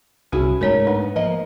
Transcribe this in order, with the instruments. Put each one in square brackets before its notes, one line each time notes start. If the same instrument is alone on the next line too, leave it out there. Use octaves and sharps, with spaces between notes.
[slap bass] C2 [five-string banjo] C#4 E4 G#4 [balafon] F#4
[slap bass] G#2 A3 [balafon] A#4 C#5 A#5
[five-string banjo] B3 [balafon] D4
[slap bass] F3 [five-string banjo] A#3 D#5